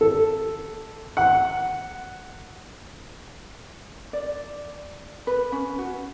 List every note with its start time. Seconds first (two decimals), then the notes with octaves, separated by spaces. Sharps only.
0.01 A4
1.17 F#5
4.13 D5
5.27 B4
5.52 C#4
5.79 F#4